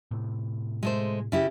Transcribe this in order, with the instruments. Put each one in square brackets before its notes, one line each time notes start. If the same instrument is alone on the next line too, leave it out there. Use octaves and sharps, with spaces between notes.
[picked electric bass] A2 C3
[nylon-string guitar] G#3 A3 C5
C#3 E4 G4